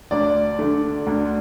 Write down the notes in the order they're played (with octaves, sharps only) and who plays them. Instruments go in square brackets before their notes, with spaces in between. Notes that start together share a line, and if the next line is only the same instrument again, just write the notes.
[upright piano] D2 D5
D3 A3
D2